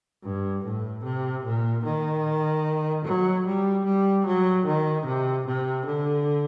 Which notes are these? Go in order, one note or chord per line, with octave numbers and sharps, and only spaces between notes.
G2
A2
C3
A#2
D#3
F#3
G3
G3
F#3
D#3
C3
C3
D3